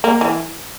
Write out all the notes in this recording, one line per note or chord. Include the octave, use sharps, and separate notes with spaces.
A#3
E3